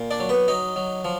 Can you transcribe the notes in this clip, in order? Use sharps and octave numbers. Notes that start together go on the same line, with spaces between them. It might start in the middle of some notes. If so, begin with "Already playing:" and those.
Already playing: A#2
D4 D5
F#3
B3 B4
F#3 D#4 D#5
F#3
F3